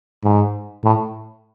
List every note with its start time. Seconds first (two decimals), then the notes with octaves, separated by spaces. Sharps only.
0.23 G#2
0.84 A2